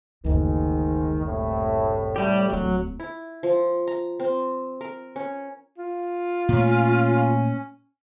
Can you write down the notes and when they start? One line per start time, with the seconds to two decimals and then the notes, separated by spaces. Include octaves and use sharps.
0.24 F#1 D2 G#2 D#3
1.26 C2 A2
2.16 G3 G4
2.50 D1 F#3 A3
3.00 E4
3.43 F3
3.88 A#5
4.20 C4
4.81 A#4
5.16 C#4
5.78 F4
6.49 A#2 A3 C#4